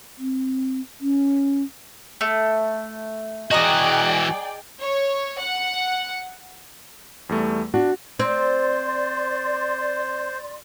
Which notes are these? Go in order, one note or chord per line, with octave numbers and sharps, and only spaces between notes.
C4
C#4
A3
E3 F#4 G#4 D5 D#5 G5 A#5 D#6
C#5
F#5
E2 G3 A3
D4 F#4
C4 C5 D5 C6